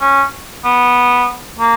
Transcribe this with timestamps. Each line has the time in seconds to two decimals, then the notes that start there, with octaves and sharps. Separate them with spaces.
0.01 C#4
0.64 B3
1.58 A#3